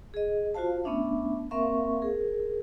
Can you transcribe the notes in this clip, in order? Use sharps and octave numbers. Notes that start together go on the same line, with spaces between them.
G#4 D#5
F4 F#4 C5 F5 A5
A3 B3 C#4 D4 E5
A#3 C4 A#4 E5 F5 C#6
G#4 A#4